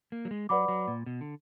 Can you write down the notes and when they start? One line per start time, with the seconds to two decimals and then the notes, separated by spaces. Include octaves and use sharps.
0.12 A#3
0.25 F#3
0.31 G#3
0.49 F#3 B4 D5 F#5 B5 D6
0.68 F#3
0.88 A#2
1.06 B2
1.21 D3